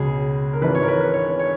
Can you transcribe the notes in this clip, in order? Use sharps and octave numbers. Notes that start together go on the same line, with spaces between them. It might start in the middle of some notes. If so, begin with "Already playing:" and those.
Already playing: C#2 B2 G#4
A#4
G#1 G#2 E3 B4
C#5
A#4
B4
B4
C#5
C#5